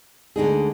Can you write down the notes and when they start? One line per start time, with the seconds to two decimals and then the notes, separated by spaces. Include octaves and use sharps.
0.36 D2 D3 G#3 D#4 G#4